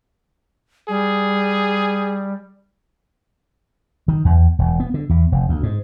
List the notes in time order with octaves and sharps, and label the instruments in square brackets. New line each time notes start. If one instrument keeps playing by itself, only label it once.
[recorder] G3 [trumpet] G#4
[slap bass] D#3
E2
E1
B3
D3
E2
F1
D2
G#2